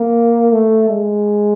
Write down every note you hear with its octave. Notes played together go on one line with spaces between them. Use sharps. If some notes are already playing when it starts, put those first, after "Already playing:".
Already playing: A#3
A3
G#3